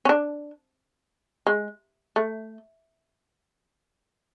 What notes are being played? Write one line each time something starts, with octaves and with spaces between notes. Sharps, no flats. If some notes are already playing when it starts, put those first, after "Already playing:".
C#4
D4
G#3
A3